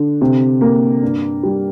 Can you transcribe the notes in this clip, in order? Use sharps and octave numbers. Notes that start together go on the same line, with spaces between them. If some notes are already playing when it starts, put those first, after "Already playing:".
Already playing: D3
C3
A#3
G2
G3